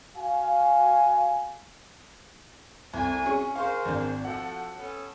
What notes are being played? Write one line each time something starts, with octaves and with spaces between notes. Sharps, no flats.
F#4 F5 G#5
C2 A3 C4 G#5
C#4 G#4 C#6
G#4 A#4 C5 F5 C#6
G#1 D4 G6
F3 F#4 A4 F#5
B3 C#4 A4